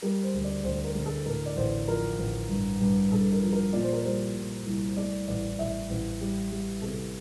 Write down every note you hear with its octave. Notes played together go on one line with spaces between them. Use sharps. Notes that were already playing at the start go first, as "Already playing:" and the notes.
G3 A#4
C5
D2
D5
D2 C5
A#4
D2
A4
A2 A#4
D5
A1 C5
F3 A#4
A1
G2
G2
G2 A4
A#4
F3
A#4
A#2 D5
C5
A#4
G3 C5
A#2
C2
A3 D5
A1 D5
A1 E5
A1
G3
G3
C3 A4